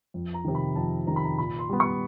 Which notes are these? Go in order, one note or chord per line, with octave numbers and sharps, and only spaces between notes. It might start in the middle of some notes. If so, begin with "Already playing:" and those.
F2
A#5
C3 D#3
B5
F2 A5
C3 D#3 A#5
B5
A#5
A#2 B5
C6
G3 B3
C#6